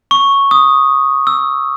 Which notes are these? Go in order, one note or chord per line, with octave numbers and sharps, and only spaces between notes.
C#6
D#6
E6